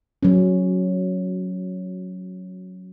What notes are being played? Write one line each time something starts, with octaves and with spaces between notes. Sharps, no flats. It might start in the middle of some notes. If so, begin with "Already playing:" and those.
F#3 C#4